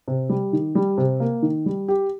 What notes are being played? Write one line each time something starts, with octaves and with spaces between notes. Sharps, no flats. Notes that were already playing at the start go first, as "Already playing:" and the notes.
C3
G3
D#3
G3
C3
A#3
D#3
G3
G4